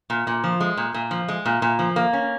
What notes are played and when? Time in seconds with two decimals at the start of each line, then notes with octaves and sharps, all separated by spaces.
0.10 A#2
0.27 A#2
0.44 F3
0.61 G#3
0.77 A#2
0.94 A#2
1.11 F3
1.28 G#3
1.46 A#2
1.62 A#2
1.79 F3
1.96 A#3
2.13 C#4